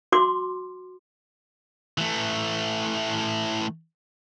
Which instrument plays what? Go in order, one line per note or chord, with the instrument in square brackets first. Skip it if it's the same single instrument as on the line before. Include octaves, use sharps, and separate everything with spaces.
[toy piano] F#4 C6 D6
[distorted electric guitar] E3 A3